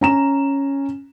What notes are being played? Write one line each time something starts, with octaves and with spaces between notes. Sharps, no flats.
C#4 A#5 E7